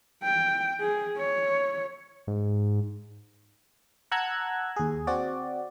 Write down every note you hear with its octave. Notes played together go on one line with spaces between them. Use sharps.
G5
G#4
C#5
G#2
F#5 A5 A#5 E6 F#6 G#6
D#2 G#4
C4 F#4 D5